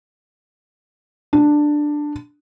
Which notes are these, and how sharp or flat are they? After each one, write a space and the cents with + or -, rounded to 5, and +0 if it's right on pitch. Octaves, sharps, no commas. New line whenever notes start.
D4 +10